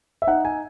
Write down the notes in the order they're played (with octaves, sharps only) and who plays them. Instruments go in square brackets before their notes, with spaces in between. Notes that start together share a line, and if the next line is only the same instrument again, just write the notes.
[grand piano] E5
D#4 F#5
G#5